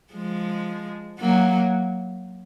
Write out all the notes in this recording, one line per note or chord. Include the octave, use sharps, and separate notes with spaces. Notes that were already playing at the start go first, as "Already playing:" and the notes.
F3 G#3
F#3 A#3